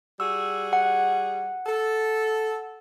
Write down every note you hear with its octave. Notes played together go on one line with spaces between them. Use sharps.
G3 F#4 G#4 E6
F#5
A4